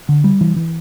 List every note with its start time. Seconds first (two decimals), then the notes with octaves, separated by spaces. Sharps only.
0.09 D3
0.24 G3
0.41 E3
0.56 E3